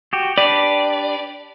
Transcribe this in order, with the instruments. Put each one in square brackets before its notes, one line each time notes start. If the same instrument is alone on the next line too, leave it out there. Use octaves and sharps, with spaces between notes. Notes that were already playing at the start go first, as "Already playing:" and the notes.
[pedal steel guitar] F#4 G4
[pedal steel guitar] D4 G4 B4 [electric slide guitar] D5